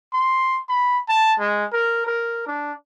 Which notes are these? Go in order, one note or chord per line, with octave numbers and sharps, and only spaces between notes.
C6
B5
A5
G#3
A#4
A#4
D4